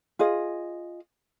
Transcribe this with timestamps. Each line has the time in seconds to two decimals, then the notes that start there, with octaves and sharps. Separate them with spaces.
0.19 F4 G#4 D#5